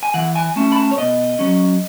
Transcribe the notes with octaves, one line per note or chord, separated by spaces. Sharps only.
G#5
E3 F#5
G#5
A3 C#4 A5
B5
A5
C#5
B2 D#5
F#3 C#4